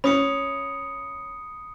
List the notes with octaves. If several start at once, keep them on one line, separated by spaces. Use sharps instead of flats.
C#4 B5 D#6 C#7